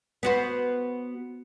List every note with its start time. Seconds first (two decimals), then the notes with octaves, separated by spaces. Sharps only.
0.23 B3 F#4 C5